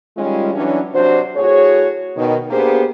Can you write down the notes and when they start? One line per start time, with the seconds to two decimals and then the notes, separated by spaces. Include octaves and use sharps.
0.17 D#3 G3 G#3 C#4 F4
0.54 E3 F#3 C#4 D4
0.94 C3 F#3 D4 F#4 C5
1.36 A2 F#4 G#4 C#5
2.17 B2 D#3
2.51 A#3 B3 D4 G4 G#4 C5